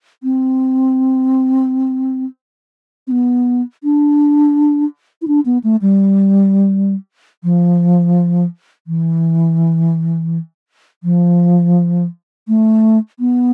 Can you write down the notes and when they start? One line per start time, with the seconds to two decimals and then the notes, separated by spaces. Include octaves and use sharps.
0.23 C4
3.07 C4
3.11 B3
3.84 D4
5.22 E4
5.28 D4
5.46 B3
5.64 A3
5.82 G3
7.44 F3
8.87 E3
11.03 F3
12.48 A3
13.20 B3